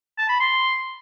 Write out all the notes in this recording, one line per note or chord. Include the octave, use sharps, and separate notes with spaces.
A5
B5
C6